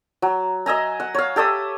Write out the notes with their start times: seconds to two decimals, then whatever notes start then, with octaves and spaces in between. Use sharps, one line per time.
0.22 F#3
0.66 D#5 E5 G#5 A#5
1.00 F#5
1.15 C#5 F5
1.36 G4 A4 E5 D#6